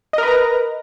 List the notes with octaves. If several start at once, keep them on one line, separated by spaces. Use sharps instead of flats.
A#4 B4 D#5 A#5